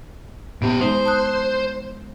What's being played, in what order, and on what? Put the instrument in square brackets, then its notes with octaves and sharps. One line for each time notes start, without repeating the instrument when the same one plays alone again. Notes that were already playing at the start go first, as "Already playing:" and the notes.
[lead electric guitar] A#2 G4 [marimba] B3
[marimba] G#3 D#4 [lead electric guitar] C5
[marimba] A5 D#6 F#6